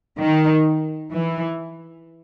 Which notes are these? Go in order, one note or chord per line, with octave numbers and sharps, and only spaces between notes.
D#3
E3